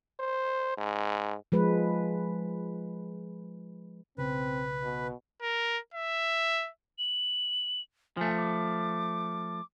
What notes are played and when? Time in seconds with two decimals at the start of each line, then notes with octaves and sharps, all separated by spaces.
0.20 C5
0.78 G#2
1.52 F3 G#3 B4
4.18 B1 C#3 C4 B4
4.83 B2
5.42 A#4
5.94 E5
6.99 F#7
8.17 F3 A3 G#5
8.37 D6